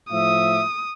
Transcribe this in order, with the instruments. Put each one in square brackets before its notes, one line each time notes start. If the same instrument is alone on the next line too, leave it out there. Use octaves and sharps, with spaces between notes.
[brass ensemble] A2 F3 E5 [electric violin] D#6